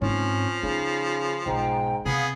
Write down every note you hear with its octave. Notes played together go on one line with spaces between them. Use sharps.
G#2 F3 C4 C#4
C#3 D#4
B1 G#2 G5 A#5
C3 B3 G#4 F5